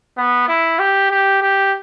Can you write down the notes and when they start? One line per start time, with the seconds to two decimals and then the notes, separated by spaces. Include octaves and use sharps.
0.18 B3
0.48 E4
0.79 G4
1.10 G4
1.42 G4